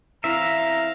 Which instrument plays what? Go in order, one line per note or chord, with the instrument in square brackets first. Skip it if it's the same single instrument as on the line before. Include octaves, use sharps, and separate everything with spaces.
[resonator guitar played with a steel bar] E3 C4 E4 [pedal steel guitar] E5 [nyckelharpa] F5 [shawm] A#5